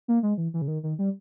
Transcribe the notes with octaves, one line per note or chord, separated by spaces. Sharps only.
A#3
G#3
E3
E3
C#3
D#3
D#3
G3